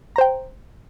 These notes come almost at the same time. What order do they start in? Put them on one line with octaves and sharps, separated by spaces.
A#5 C5 G5